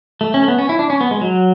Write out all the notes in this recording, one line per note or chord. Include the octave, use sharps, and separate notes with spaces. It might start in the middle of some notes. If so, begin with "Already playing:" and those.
A3
C#4
A3
B3
C#4
E4
D4
C#4
B3
G#3
F#3